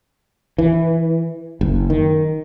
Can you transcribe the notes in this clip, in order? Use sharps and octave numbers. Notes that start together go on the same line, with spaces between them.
E3
F#1
D#3